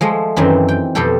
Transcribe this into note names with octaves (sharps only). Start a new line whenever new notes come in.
F3 G#3 A3
F#2 D#3 E3 C4
G5
F2 B2 G4 A4 G5